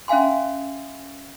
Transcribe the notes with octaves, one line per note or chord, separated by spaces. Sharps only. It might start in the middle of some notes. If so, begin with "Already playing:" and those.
C#4 E5 F5 G#5 C6